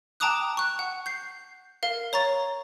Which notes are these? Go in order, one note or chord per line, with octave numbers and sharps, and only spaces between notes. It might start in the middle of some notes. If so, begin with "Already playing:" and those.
G5 A5 A#5 D6 D#6 F#6
C#6 F#6
F#5
G6 C7
A#4 F5
C#5 A#5 C#6 A6